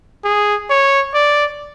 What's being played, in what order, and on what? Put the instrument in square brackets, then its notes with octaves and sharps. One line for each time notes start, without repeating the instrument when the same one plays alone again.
[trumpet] G#4
C#5
D5